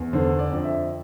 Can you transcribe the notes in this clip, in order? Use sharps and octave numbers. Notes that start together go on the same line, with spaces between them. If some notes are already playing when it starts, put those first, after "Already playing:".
Already playing: E2
D3 C5
D5
F2
E5